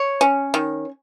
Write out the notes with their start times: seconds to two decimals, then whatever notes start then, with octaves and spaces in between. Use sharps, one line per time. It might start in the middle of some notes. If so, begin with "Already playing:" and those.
Already playing: C#5
0.21 C#4
0.54 D#3